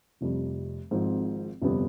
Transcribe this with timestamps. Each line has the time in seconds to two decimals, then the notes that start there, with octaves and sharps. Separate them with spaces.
0.21 F1 F2 C3 G3
0.91 G#1 G#2 F3 C4
1.62 G1 F2 C3 G3 B3